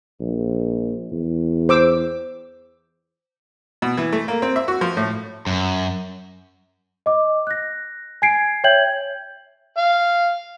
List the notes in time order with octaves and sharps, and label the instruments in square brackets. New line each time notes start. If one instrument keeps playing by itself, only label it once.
[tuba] A#1
E2
[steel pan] C5 D6 E6
[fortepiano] B2
E3
A3
A#3
C4
E5
F#4
F3
A2
[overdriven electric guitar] F#2
[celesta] D#5 D6
F#6 A#6
G#5 G#6 C7 D7
C#5 E5 G5 G6 G#6 F#7
[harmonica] F5